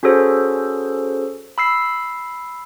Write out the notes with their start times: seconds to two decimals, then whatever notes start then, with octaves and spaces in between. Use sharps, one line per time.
0.03 C#4 F#4 G#4 A4 C5
1.58 B5 E6 C7